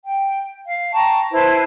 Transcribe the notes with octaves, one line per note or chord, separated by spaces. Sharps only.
G5
F5
G5 A5 A#5 C#6
E4 B4 C5 A5